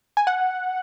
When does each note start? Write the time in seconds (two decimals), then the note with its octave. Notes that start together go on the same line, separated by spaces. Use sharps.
0.17 G#5
0.27 F#5